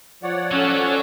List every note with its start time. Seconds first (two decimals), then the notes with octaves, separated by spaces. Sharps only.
0.23 F3 C#5 D5 F#5
0.51 F#3 C#4 A4